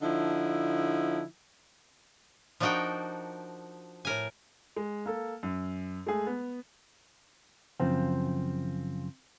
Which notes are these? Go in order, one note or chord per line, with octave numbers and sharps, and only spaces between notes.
D3 F3 D#4 E4
F3 D4 D#4 F#4 A#4 G5
A2 A#4 G#5
G#3
A#3 A4
F#2
G#3 A3 G#4
B3
F#2 C#3 F3 C4